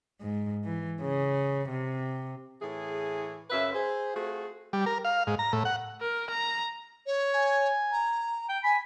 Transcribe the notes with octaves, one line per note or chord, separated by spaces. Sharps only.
G#2
E3
C#3
C3
A2 E3 G#4
F#2 C#3 B4 E5
G#4 C5
A3 C4 F4 F#4 G#4
G3
A#4
F5
G#2
A#5
A2
F#5
A#4
A#5
C#5
G#5
A#5
G5
G#5 B5